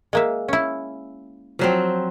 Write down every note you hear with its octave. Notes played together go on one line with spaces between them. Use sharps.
G#3 A#3 E5
C#4 E4
F3 F#3 C4